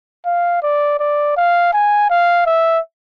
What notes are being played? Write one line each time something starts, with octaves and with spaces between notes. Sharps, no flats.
F5
D5
D5
F5
G#5
F5
E5